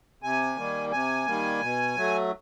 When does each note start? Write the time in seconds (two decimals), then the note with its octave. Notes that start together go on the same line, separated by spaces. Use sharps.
0.22 C3 G#5
0.57 D#3 G3 A#3
0.92 C3 G#5
1.27 D#3 G3 A#3
1.61 B2
1.97 F#3 A3